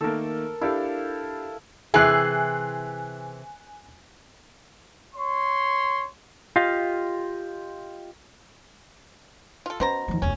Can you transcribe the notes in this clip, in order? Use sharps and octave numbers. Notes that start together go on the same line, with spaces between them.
D#3 A3 A#3 A4 A#4
D4 E4 G4 A4 F5
C3 E3 G#4 G#5 F#6 C7
C#5 C6
F4 G4 D#5 F5
F4 A4
B2 C#4 C5 A#5
D#2 F3
E1 D2 C#4